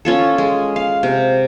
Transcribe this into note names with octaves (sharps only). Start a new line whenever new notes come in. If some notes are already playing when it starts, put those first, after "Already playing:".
C#4 F4 A4
G#3
F5
C3